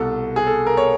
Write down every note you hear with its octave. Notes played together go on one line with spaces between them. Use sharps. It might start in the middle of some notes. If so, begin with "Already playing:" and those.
Already playing: C2 B2 A4
G#4
A4
A#4
C#5